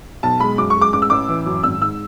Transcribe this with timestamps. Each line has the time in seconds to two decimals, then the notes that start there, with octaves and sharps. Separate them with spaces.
0.23 B1 A5
0.40 G#3 B5
0.58 F#2 D6
0.70 C#6
0.76 G#3
0.81 D6
0.93 A1 D6
1.02 E6
1.10 A1 D6
1.29 E3
1.46 F#2
1.63 G#1 E6
1.81 G#2 E6